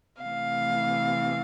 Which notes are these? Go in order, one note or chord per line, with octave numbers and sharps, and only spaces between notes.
C3 E3 A3 F5